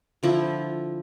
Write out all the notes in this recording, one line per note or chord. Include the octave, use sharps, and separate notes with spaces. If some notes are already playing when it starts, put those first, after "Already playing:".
D3 F3 E4